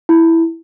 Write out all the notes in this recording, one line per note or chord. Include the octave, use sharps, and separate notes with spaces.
E4